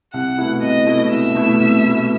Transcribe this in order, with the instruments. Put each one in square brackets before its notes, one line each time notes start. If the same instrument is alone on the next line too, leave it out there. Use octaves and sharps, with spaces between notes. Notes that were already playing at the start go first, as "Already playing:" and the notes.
[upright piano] C2 [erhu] F#5
[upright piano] B2 A3 E4
[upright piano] C2 [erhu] D#5
[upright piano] B2 A3 E4
[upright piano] C2 [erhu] E5
[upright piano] B2 A3 E4
C2
B2 A3 E4